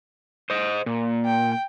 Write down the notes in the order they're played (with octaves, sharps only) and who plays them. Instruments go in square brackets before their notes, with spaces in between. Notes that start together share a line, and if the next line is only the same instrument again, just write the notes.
[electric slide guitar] C5 D#5
A#2
[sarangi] G5